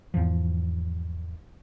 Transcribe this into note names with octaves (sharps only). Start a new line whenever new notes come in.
E2 G#2 E3 F3